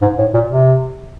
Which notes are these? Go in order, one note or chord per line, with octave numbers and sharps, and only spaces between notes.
G#2
A2
A#2
C3